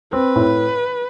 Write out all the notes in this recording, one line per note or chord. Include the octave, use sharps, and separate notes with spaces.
C4 B4
A2